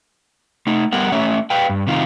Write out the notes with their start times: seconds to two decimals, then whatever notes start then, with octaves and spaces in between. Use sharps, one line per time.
0.67 A3 D#4
0.92 G3 B3 A#4 F#5
1.12 A3 C#4 C#5 E5
1.50 B4 F5 G5
1.69 G2
1.87 C3 D#3 F4